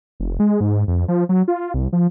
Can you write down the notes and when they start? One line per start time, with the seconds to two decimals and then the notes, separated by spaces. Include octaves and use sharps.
0.20 F1
0.40 G#3
0.61 G#2
0.88 F2
1.08 F3
1.29 F#3
1.48 F4
1.74 C2
1.93 F3